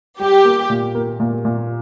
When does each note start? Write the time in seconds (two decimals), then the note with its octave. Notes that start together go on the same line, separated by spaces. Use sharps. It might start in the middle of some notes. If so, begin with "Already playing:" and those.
0.20 G3 G4
0.45 A#3
0.70 A#2
0.95 A#3
1.20 A#2
1.45 A#2